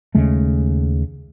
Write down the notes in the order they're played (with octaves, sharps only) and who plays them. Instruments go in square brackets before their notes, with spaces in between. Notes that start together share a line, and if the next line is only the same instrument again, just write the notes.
[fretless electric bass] D#2 C#3 G#3 A3